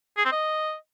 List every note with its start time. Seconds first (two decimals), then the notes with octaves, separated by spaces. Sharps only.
0.17 G#4
0.24 C4
0.32 D#5